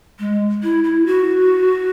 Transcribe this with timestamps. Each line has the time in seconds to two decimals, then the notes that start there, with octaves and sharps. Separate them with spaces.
0.19 G#3
0.63 E4
0.84 E4
1.06 F#4